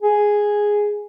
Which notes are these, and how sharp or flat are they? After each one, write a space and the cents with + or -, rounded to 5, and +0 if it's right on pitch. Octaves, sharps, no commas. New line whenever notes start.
G#4 +0